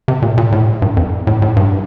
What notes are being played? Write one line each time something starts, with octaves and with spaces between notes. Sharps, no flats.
C3
A#2
A#2
A2
G2
F2
A2
A2
G2